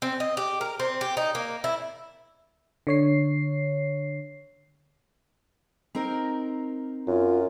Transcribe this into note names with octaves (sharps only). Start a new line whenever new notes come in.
C4
D#5
G4
A#4
C4
G4
D#4
A#3
E4
D3 C#5 C7
C4 D#4 A#4
F#2 F4